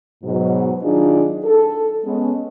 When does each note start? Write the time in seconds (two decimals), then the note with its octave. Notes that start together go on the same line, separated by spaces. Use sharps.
0.24 G#2 B2 F#3
0.82 D#3 F#3 D4 D#4 F4 G#4
1.45 A4
2.05 G#3 B3 C#4